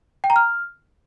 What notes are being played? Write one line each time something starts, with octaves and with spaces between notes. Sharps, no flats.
G5
A#5
F6